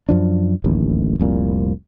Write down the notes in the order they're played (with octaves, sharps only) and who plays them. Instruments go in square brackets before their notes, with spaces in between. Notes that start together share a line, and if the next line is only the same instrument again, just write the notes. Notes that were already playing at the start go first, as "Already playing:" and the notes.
[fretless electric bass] F#2 F3 D4
D1 A1 D#2
F1 C2 A#2